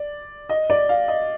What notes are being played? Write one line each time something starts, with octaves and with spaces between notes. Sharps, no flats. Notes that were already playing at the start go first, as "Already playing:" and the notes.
Already playing: D5
D#5
D5
F5
D#5